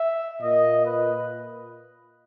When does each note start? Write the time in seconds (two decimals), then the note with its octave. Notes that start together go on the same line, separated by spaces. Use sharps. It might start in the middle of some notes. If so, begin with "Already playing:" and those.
Already playing: E5
0.41 A#2 A#3 D#5
0.85 B4